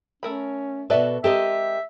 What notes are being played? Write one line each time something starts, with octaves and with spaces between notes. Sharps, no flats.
A3 C#4 A#4 B5
B2 F#4 A4 B4 D5 E5
G#3 C4 G4 A4 A#4 D#5 E5